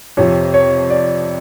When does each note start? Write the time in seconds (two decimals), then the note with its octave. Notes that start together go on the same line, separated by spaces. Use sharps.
0.17 F2 C3 F3 C#5
0.54 C#5
0.90 D5